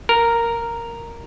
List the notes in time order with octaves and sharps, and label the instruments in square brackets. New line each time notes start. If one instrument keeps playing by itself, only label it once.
[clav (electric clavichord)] A#4